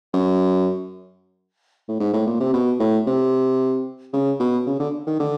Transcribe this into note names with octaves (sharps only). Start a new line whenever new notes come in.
F#2
A2
G#2
A2
A#2
C3
B2
A2
C3
C#3
B2
C#3
D3
D#3
D3